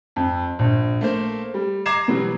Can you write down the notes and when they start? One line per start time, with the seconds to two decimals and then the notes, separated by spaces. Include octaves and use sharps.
0.16 F2
0.59 A#1
1.01 A3 A#3 C5
1.54 G3
1.86 A#5 D6 G#6 C7 E7
2.08 B2 E3 F#3 G3